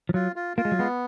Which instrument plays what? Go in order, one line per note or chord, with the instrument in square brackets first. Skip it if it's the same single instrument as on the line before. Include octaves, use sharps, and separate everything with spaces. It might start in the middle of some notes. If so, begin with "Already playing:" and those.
[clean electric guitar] F3
[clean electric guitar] F#3 [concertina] F4
[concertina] F4
[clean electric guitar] A#3 [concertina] F4
[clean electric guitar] G#3
F#3
[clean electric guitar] G#3 [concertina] B3